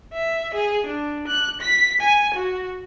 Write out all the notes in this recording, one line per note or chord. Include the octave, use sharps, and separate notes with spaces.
E5
G#4
D4
F#6
B6
G#5
F#4